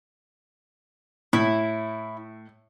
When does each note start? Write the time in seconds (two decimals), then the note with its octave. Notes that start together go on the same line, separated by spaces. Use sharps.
1.33 A2 E4